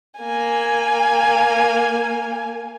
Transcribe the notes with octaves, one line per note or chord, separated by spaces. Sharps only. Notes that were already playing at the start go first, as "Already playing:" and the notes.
A#3 G#5